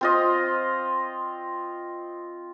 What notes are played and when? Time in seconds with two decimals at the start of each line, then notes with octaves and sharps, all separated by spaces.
0.01 C4 F4 D#5